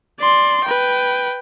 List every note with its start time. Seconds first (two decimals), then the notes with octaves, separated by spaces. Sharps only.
0.20 D5 C6
0.64 B4 G5